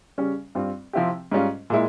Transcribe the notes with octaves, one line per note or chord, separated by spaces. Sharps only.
C#3 G3 C#4
G2 G3 C4 F4
C3 F3 C4 E4 G4
G#2 G3 C#4 F4
A#2 G#3 E4